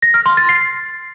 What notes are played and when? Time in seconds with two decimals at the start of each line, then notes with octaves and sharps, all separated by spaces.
0.02 A#6
0.14 F6
0.26 C6
0.37 A6
0.49 C7